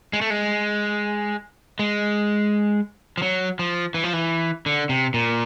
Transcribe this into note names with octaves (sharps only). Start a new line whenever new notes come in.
G#3
A3
G#3
G#3
F3
F#3
F3
E3
F3
E3
D3
C3
A#2